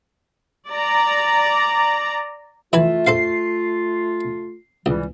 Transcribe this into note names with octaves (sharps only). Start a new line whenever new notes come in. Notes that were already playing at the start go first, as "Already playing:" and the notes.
D5 A#5
E3 A3 F4 B4 E5 G#5
A4 C5 F5 C7
C#2 E3 G3